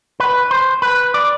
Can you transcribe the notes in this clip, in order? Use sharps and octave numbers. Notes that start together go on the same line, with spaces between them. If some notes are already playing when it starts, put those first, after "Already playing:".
B4
C5
B4
D5